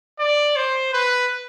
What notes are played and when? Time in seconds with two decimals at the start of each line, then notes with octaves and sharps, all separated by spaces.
0.19 D5
0.56 C5
0.93 B4